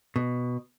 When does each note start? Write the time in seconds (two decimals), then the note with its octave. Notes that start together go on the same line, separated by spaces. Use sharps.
0.16 B2